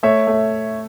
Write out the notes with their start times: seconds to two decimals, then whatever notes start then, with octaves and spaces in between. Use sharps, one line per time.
0.03 A3 C#5 E5
0.27 A3